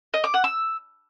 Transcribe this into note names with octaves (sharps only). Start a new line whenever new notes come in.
D#5
D6
F#5
E6